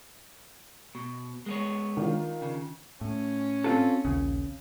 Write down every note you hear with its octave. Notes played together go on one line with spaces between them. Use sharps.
B2
G#3 B3 C#5
D#3 D4 F4
C#3
A2 C#4
C4 F4 A4
D#1 A#1 C#3